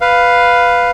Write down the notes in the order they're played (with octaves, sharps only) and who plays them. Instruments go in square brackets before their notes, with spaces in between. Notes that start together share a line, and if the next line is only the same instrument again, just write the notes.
[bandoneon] B4 F5